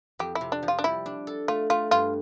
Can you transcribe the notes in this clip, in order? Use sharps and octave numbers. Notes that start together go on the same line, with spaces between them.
F2 G4
E4
C3
D4
F3
F4
D4
G3 E4
D4
A4
A3 F4
A3 F4
G2 F4